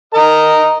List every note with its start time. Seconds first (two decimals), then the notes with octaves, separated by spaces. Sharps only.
0.14 A#4 D#5 A#5